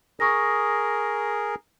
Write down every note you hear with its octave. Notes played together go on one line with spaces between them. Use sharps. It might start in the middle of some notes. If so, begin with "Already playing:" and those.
G#4 A#4 C#6 D#6 A#6